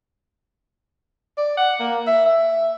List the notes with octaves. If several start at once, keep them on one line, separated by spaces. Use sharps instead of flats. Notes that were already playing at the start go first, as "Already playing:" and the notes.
D5
F#5
A#3
E5
E5